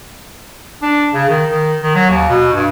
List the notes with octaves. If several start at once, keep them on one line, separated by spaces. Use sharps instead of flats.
D4
C#3
D#3
D#3
D#3
F#3
D#2
B2
G2